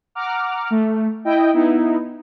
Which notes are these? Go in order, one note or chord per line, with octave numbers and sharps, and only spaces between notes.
F#5 A#5 D6 F6
A3
E4 D#5 G5
B3 D#4 E4